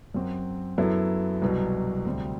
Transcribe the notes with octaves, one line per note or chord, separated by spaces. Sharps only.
F#2 F#3 C4 F#4
F#2 F#3 B3 E4 A4
C2 B2 F#3
D2 C3 G3 C4